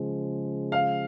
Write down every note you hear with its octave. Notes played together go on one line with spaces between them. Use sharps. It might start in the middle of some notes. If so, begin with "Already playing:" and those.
Already playing: C#3 F3 G#3
F5